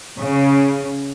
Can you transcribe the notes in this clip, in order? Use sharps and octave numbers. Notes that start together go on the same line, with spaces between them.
C#3